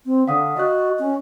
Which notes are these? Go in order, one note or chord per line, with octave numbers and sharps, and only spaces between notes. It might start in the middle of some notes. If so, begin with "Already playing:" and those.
C4
D3 F5 F#5 D#6
F#4 D#5 F#6
C#4